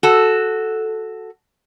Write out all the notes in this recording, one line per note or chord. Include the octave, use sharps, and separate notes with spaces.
F#4 A4